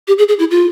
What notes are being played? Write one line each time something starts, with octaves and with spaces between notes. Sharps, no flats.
G4
G#4
G#4
E4
F4